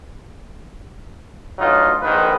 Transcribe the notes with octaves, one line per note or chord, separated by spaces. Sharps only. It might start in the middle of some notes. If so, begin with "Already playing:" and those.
D2 F#3 D#4 F4
A#1 G#2 D#3 B4